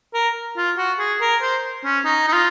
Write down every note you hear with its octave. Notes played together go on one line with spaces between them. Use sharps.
A#4
F4
F#4
G#4
A#4
C5
C#4
D#4
D#4
F4